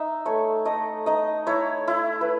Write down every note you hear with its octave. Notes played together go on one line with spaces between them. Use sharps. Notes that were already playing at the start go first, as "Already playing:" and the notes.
Already playing: D#4 E5
A3 C#5
A3 D#5
D#4 D#5
E4 C#5
E4
B4